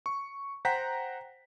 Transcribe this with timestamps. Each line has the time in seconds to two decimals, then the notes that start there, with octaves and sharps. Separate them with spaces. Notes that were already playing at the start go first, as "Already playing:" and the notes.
0.06 C#6
0.65 C5 F#5 G5 A#5 B6